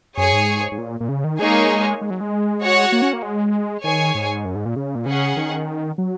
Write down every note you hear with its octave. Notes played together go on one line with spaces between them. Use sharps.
F#2 G#4 C#5 G#5
G#2
G#2
A#2
A#2
C#3
D#3
G#3 A#3 D#4 G#4 C#5 G#5
G#3
F#3
G#3
F#4 C#5 F#5
A#3
C#4
A#3
G#3
D#3 G#4 C#5 G#5
G#2
F#2
G#2
A#2
C#3
A#2
C#3 C#4 G#4 F#5
D#3
F#3